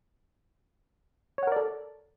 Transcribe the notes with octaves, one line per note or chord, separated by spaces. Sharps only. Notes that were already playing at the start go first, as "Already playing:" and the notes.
A4 A#4 C#5 D5 F#5